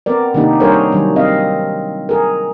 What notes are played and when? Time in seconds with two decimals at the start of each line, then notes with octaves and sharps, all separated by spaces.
0.06 B3 C4 A#4 D5
0.34 C3 D#3 A#3 D4 D#4 G4
0.60 G3 D4 G#4 A#4 C5 C#5
0.92 D#3 F#3 G3 D4
1.16 C4 D#5 F5
2.09 G#4 A#4